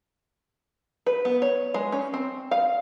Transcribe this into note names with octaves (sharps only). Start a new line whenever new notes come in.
B4
B3
C#5
G#3
C#4
C4
F5